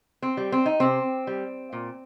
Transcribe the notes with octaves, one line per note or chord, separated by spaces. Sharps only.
C4
G3
C4
D#4
C3 C4
G3
A#2